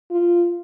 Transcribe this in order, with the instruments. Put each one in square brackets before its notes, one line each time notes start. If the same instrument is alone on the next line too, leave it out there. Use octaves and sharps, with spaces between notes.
[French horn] F4